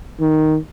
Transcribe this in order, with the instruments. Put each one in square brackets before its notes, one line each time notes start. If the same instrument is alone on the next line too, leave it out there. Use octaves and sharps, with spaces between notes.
[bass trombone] D#3